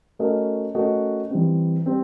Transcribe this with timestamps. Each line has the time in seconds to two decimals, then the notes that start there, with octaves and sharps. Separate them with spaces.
0.19 A3 C#4 F#4 A#4 D#5
0.75 A3 C#4 F#4 A#4 D#5
1.30 E3 G3 C4
1.86 G3 C4